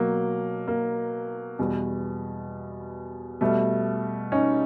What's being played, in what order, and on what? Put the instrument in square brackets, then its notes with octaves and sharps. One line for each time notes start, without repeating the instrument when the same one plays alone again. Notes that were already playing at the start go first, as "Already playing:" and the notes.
Already playing: [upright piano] B2 F#3 A#3
A#3
E2 B2 G3
B2 G3 A3
C#4 D#4